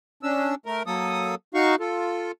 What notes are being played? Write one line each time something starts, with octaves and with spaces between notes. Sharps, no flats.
C#4 D4 E6
A3 A#4
F#3 A#3 A4 D#6
D#4 F#4 F5 C#6
F4 A4